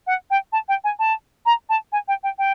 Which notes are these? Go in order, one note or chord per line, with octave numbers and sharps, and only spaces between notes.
F#5
G5
A5
G5
G#5
A5
A#5
A5
G#5
G5
G5
G5